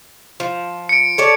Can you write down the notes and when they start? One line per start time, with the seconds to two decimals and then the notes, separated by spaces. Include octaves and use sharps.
0.40 F3
0.89 C#7 D7
1.18 A4 C#5 D5